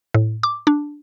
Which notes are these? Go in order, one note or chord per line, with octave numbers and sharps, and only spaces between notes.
A2
D6
D4